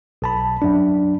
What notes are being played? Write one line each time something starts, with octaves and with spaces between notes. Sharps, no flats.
B1 A5 B5
F#2 D4